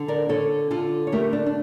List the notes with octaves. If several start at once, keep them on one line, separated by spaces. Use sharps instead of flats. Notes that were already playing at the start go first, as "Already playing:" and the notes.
Already playing: D3
A#4 D5
D3 A4 C#5
D3 F4 A4
C#5
A3 G4 A#4
D4
D4